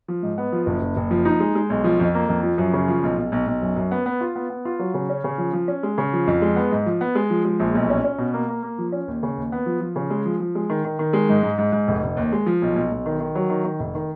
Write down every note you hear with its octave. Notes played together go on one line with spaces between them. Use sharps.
F3
G#2
B3
F3
F#1
F#1
F#1
F3
D#4
G#3
G#3
B1
F3
F2
A#3
F2
F3
F#2
C#3
F3
B1
B1
B1
B1
F#2
F#2
B3
B3
F4
B3
B3
F4
F#3
C#3
C#4
C#3
F3
F3
C#4
G#3
C#3
F3
F2
G#3
B3
G#2
F3
B3
G#3
F3
G#3
A#1
B1
C#4
C#4
B2
A#3
A#3
A#3
F3
C#4
D#2
C#3
D#2
B3
F3
F3
C#3
G#3
F3
F3
G#3
D#3
D#3
D#3
G#3
G#2
G#2
G#2
G#2
F1
F1
D#2
G#3
F3
B1
B1
B1
D#3
D#3
F#3
D#3
D#3
F1
D#3